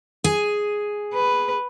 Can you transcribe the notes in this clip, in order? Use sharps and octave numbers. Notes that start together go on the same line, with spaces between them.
G#4 G#5
B4